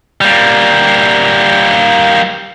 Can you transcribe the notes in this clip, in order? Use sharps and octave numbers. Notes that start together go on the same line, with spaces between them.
G3 A#3